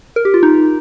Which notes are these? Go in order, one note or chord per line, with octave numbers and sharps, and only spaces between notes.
A#4
G4
F4
D#4